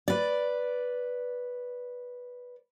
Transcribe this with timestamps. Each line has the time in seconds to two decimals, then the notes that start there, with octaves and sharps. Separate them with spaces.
0.08 B4 D5